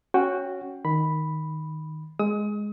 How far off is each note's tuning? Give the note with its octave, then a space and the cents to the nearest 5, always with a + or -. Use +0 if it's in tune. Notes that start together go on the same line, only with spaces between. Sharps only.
C#4 +0 F#4 +0 G5 +15
D#3 +0 B5 +0
G#3 +0 D#6 +35